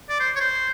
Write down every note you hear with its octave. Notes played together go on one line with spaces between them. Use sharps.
D5
C5
C#5
C5